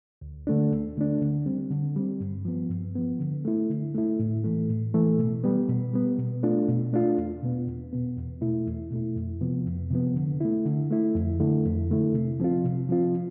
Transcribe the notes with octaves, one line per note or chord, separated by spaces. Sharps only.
D2
D3 A3 D4
D2
D3 A3 D4
D3
G3 C4
D3
G3 C4
G2
F3 B3
G2
F3 B3
D3
A3 E4
D3
A3 E4
A2
E3 A3
A2
E3 A3
B2
G3 B3
B2
G3 B3
B2
A3 D4 F4
B2
A3 D4 F4
E2
B2 B3
E2
B2 B3
E2
B2 A3 E4
E2
B2 A3 E4
F2
C3 F3 B3
F2
C3 F3 B3
D3
A3 E4
D3
A3 E4
F2
D3 A3 E4
F2
D3 A3 E4
C3
F3 C4 F4
C3
F3 C4 F4